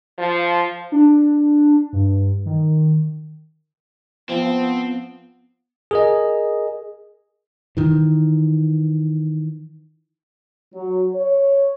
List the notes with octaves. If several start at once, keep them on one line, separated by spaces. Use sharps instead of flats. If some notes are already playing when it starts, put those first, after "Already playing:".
F3
D4
G2
D#3
F3 B3 C4
G#4 A#4 D#5
D#3 E3
F#3
C#5